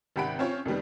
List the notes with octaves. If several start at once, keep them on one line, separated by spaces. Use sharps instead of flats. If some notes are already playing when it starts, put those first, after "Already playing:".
G#1 C3 G4 F#5 B5 D7
C4 C#4 F4 C#5
F2 D#3 G3 B3